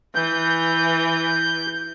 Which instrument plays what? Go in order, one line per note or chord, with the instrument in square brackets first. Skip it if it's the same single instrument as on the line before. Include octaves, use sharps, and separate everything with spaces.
[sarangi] E3 [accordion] G6